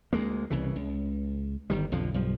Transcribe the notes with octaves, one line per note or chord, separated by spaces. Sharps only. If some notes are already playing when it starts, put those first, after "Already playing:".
D2 G#3 A#3
C2 C#3 E3
C#2
G1 D#3 G3
B1 F2 D3 F3
B1 G2 F3